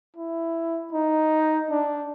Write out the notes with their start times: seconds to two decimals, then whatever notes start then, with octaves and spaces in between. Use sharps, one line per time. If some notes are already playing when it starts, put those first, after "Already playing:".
0.16 E4
0.92 D#4
1.70 D4